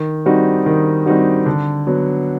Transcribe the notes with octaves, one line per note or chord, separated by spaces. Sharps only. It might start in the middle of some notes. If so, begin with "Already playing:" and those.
Already playing: D#3
G3 C4 D#4 F#4
D#3
G3 C4 D#4 F#4
D3
F#3 B3